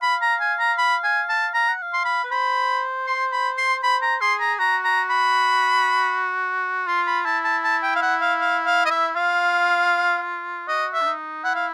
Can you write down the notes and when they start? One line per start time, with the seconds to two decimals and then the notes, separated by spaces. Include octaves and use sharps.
0.02 F5 B5
0.22 A#5
0.40 G#5
0.59 A#5
0.78 B5
1.04 G#5
1.29 A5
1.54 F5 A#5
1.68 F#5
1.82 F5
1.93 C6
2.05 B5
2.24 B4
2.31 C5 B5
3.07 C6
3.32 B5
3.57 C6
3.83 C5 B5
4.02 A#5
4.21 G#4 C6
4.40 A#5
4.59 F#4 A#5
4.84 A#5
5.10 B5
6.87 F4 C6
7.06 B5
7.25 E4 A5
7.44 A5
7.64 A5
7.83 G5
7.96 F5
8.02 F#5
8.21 F5
8.40 F5
8.65 F5
8.86 D#5
8.90 E5
9.16 F4 F5
10.68 F#4 D#5
10.93 E5
11.01 D4
11.06 D#4
11.44 E4 F#5
11.55 F5